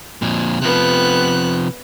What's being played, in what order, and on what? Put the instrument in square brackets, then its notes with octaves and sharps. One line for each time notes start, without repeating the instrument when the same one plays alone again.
[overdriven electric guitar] F2 A#2
[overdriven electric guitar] C3 F3 [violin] B3 F#6